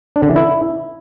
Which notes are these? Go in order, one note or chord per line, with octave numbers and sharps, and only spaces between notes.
D4
D3
E3
E4